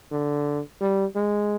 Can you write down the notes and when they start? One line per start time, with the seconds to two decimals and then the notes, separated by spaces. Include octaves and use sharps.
0.11 D3
0.81 G3
1.16 G#3